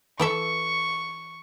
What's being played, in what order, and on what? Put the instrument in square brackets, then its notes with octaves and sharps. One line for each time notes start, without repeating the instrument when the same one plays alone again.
[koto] E3 A4 E5 [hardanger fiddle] C#6